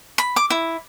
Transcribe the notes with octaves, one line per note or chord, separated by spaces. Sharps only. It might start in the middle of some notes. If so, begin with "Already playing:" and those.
B5
D6
E4